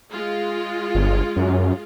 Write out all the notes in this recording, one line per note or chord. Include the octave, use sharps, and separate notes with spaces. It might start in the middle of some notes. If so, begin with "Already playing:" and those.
G#3 F4
G1
F#2